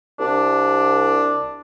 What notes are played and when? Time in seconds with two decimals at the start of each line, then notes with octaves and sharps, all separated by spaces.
0.19 C2 D4